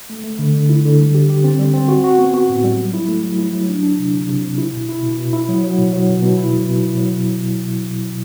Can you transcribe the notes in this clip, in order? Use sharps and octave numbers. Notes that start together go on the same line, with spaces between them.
A3
A3
D3
D3
E4
D3
G3
G4
G4
C4
G3
C4
F#4
F#4
B3
F#4
A2
G3
F#3
E4
A3
F#3
E4
F#3
D4
D4
C3
C3
C3
C3
E4
B2
E4
B2
B2
E4
F#3
F#3
B2
F#3
B2
B2
E4
F#3
B2
E4
F#3